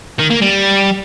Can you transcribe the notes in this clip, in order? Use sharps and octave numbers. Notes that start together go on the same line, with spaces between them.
D#3
A#3
G3